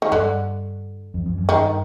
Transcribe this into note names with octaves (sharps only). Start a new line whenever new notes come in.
D#3
G2 D3
F2
F2
F#2
G2 D#3